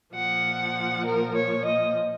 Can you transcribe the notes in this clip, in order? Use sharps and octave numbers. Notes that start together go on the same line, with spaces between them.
A#2 F3 F#5
A#4
C#5
D#5